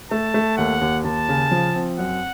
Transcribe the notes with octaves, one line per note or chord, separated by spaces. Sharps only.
A3 A5
A3
D#2 F#5
D#2
D#2 A5
C#3
F3
C4
F#2 F#5